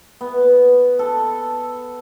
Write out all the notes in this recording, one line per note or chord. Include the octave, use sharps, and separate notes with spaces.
B3
A4